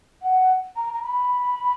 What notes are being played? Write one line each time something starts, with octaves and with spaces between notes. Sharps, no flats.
F#5
A#5
A#5
B5